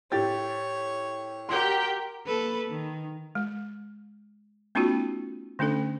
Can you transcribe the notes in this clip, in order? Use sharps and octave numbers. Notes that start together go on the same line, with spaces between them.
A2 G4 C#5 A6
F#4 G4 A#4 G5 C6
A#3 A4 B4
D#3
G#3
A3 B3 C#4 D#4 F4 F#4
D3 A3 C#4 D4 A4